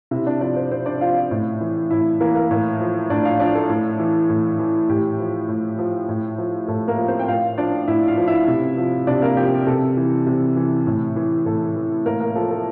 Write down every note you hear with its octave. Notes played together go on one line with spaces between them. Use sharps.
C3 E4 E5
D4 D5
F3 D4 D5
C4 C5
C3 C4 C5
D4 D5
F3 F4 F5
A2
E3
A2 E4 E5
E3 A#3 A#4
A#3 A#4
A2
F3
A2 D4 D5
F4 F5
F3 D4 D5
A4
A2
E3
A2
E3
A2 G4
F3
A2
F3
A2
F3
A2 A4
A#3 A#4
F3
C4 C5
G5
A2 F4 F5
F3 D4 D5
A2 E4 E5
F4 F5
F3
E4 E5
C3
F3
C3 D4 D5
A#3 A#4
F3 G4
C3 A4
E3
C3
E3
A2
E3
A2 A4
E3
A2 A#3 A#4
A#3 A#4
F3 A4
A4